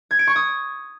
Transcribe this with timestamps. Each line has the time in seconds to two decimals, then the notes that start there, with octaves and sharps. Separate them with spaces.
0.11 G#6
0.19 D7
0.27 C#6
0.36 D#6